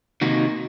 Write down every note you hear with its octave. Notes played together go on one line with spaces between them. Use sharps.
C3 D#3 A#3 D#4 F#4